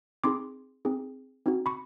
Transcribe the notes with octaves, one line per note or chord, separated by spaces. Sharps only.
C4 D#4 G#4 C6 D6
C4 D#4 G#4
C4 D#4 F#4
B5 C#6